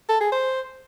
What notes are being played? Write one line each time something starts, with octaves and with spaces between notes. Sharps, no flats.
A4
G#4
C5